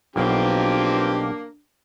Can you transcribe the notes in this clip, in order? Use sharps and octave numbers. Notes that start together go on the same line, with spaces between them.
B1 B2 F3 A#3 C4 D4 G4